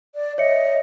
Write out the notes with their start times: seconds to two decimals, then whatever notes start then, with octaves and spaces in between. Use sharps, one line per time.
0.15 D5
0.38 C#5 D#5 E5 C#7